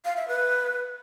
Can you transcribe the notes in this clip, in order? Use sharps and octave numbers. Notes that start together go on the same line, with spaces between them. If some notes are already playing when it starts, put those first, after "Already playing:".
F5
E5
B4